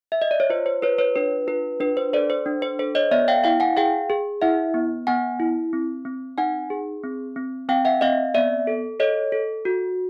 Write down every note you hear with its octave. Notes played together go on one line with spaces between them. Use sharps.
E5
D#5
D5
C#5
F4 C5
C5
F4 B4 C#5
B4 C#5
D4 B4
F4 B4
D4 B4
C5
A4 C5 D5
C5
D4
C5
A4 C5
C#5 D#5
B3 D5 E5
F5 G5
E4 F5 G5
F#5 G#5
G#4 F5 G5
G#4
E4 E5 F#5
B3
B3 F#5 G#5
E4
C4
C4
D#4 F#5 G#5
G#4
C4
C4
C4 F5 G5
E5 F#5
C4 D#5 F5
B3 D5 E5
A4
A4 C#5 D#5
A4
F#4